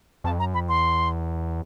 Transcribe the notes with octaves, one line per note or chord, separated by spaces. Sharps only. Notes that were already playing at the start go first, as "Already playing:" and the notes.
F2 A5
F#2 A#5
F2 B5
E2 C6